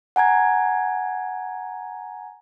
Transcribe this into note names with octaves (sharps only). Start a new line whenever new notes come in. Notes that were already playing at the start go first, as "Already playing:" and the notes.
F#5 G#5 A#5 G#6